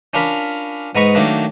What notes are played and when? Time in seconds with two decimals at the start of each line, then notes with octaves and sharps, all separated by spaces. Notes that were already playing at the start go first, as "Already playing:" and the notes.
0.13 C#4 D4 F4 A#4 B5
0.95 G#2 B3 D#5 A#5 B5 C#6
1.15 D#3 F#3 A3 A#3 D4